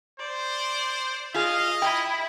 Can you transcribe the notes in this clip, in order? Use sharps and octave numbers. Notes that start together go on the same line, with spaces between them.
C5 D5
F4 G#4 D#5 F5
E4 G5